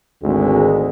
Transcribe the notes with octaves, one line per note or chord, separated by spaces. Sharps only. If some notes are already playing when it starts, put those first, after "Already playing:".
G#1 D2 G#3